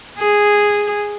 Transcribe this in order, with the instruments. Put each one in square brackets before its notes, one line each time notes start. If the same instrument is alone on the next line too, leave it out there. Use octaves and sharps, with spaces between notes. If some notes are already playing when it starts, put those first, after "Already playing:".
[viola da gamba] G#4